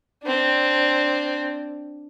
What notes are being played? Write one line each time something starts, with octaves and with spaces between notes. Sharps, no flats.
C4 D4